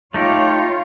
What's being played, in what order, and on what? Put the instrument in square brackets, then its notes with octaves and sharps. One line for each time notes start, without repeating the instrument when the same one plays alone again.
[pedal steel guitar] A3 D#4 G4 [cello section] F4 C#5